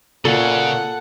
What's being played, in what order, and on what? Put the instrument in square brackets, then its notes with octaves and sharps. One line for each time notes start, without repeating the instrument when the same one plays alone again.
[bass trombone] A#2 [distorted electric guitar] C#3 [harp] A4 [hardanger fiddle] F#5